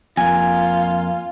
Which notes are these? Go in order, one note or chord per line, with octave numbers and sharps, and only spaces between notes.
F2 A#3 F4 G#5